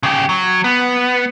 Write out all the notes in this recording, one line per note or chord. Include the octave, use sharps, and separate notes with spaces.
C#3 G4
F#3
B3